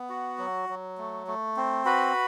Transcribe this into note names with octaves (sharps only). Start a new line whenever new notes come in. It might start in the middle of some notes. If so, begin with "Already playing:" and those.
Already playing: B3
F#4
F#3
F#3
A3
A3
C4
F#4 B4 B5